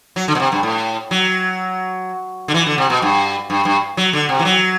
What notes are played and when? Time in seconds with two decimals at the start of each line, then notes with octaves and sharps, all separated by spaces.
0.16 F#3
0.28 D3
0.35 B2
0.40 C3
0.52 G2
0.63 A2
1.11 F#3
2.48 D3
2.54 E3
2.66 D3
2.78 C3
2.90 B2
3.02 G2
3.50 G2
3.65 G2
3.97 F#3
4.13 D3
4.29 C3
4.39 E3
4.45 F#3